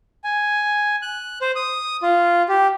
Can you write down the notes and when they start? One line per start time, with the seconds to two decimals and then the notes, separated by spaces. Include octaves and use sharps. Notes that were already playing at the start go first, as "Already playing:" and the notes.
0.24 G#5
1.02 F#6
1.41 C5
1.56 D#6
2.03 F4
2.49 G4